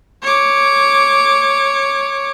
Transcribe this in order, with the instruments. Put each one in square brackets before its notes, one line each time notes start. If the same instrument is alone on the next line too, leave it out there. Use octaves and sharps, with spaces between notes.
[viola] C#5 D6